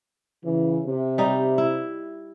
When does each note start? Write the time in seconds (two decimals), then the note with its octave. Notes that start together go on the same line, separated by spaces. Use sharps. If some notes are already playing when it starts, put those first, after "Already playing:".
0.44 C#3 E3
0.86 C3
1.18 G3 D#4
1.58 E4